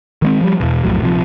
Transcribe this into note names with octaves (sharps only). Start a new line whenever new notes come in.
D#3 G#3 C4
F3 G3
E2 B2
B1 F2 A2 F#3
A#1 C3 F3